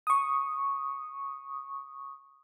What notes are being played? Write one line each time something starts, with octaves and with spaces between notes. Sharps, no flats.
C#6 D#6